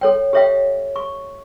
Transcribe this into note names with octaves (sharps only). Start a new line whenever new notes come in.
A4 C#5 G5
G4 A4 C#5 E5 F5 G5
C#6